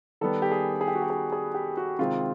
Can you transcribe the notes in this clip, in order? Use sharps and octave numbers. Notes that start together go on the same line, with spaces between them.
D#3 G3 B3 A4
G4
G#4
G#4
G4
F#4
G4
G#4
G#4
G4
F#4
C3 D#3 G#3 C4 F4